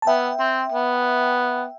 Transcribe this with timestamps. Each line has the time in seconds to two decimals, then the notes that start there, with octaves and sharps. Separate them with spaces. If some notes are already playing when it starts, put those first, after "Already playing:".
0.02 A5
0.07 B3 E5 G5
0.40 C4
0.72 B3